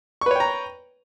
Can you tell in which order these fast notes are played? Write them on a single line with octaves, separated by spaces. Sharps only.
C#6 B4 C#5 G5 A#5